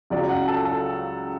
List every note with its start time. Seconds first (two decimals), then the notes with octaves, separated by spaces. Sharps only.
0.10 C#2 C#3 F#3 D5
0.29 F#5
0.48 A4
0.65 A4